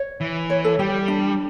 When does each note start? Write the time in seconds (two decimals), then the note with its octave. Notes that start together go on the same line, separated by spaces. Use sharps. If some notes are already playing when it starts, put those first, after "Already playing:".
Already playing: C#5
0.21 E3
0.50 C#5
0.64 A4
0.79 G3 G4
1.08 D4